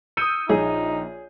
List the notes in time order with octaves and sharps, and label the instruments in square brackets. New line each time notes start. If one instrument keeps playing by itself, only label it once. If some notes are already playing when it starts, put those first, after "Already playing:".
[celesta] D#6 C#7 [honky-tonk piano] E6 G6 D#7
[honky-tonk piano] A#1 [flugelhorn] D#4 [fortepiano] G#4 [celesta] C#5